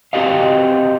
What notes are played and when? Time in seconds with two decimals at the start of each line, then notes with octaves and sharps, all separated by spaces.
0.13 C4 F#4 G4 D#5 F5